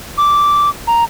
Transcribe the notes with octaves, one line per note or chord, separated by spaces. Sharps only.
D6
A#5